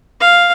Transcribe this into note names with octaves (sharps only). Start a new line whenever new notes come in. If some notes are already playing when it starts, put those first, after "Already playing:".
F5